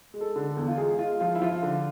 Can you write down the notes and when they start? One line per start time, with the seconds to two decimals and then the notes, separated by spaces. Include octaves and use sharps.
0.14 G#3
0.21 A4
0.36 D3
0.49 A4
0.57 E2
0.68 F4
0.77 G#3 G#4
0.99 G#3 F4
1.20 F3 F4
1.35 E4
1.42 F3 F4
1.63 D3